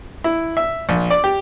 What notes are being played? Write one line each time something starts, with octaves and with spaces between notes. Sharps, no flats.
E4
E5
A#1
D5
G4